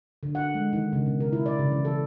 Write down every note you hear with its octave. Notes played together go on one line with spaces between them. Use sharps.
D3
F#5
G#3
D#3
C#3
B2
A#4
E4
D5
C#3
E3
A4